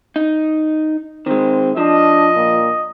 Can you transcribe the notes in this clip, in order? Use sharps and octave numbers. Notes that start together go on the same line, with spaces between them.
D#4
D#3 G#3 C4
F3 D4 D#5
A#2